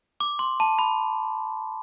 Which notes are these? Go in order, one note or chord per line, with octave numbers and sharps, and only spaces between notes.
D6
C6
A5
B5